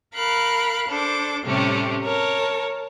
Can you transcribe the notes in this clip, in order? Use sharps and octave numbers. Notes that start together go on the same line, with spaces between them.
A#4 F5 B5 F#6
D4 A4 C5 D6
A2 C3 G3 A3 C#4 G4
A#4 C#5 A5